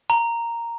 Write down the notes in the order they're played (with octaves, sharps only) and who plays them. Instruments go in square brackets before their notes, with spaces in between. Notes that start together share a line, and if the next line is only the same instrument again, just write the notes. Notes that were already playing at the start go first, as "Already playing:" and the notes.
[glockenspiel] A#5